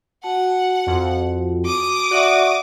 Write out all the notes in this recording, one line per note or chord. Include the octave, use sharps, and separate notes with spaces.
F#4 F#5 A5
F2
D6 D#6
F#4 D5 E5 F#5